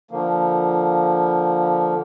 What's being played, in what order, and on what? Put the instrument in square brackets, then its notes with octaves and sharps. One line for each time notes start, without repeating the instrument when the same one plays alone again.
[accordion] D3 F3 A#3